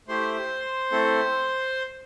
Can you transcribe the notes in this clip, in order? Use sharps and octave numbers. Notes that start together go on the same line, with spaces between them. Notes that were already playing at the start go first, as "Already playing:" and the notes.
A3 E4 G4 C5 C6
A3 C4 E4 A4